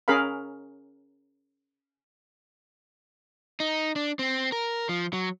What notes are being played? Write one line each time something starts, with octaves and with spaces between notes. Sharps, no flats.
C#4 G#4 A#4 F5 B5
D#4
D4
C4
A#4
F3
F#3